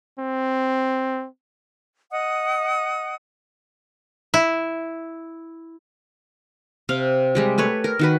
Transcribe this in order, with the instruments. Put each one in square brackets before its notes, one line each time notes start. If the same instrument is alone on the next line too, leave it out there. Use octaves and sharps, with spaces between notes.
[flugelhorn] C4
[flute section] D#5 F#5 D#6
[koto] E4
[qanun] C3 F5
G3 G#3 G4
A3 B4 C#5
A#4
D#3 F#4 B4